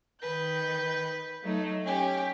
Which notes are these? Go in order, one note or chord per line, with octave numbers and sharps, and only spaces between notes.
D#3 B4 G6
F#3 A3 D#4
C#4 G4 G5